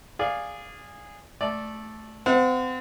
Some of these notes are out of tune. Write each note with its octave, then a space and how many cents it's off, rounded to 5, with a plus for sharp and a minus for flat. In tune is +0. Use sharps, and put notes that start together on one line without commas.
G#4 -15 D5 +0 F5 +5
A3 -10 D5 +0
C4 -35 F#5 -35